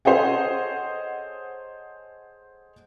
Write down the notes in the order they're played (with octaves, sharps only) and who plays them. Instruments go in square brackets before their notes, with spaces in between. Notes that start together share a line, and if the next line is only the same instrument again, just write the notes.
[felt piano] G#4 A4 C5 C#5 D#5 F#5